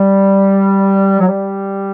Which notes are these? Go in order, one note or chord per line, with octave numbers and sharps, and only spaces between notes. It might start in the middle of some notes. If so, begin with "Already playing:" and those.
Already playing: G3
F#3
G3